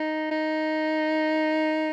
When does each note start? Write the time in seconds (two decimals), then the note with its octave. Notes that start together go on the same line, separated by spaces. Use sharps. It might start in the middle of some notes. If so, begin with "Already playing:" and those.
Already playing: D#4
0.31 D#4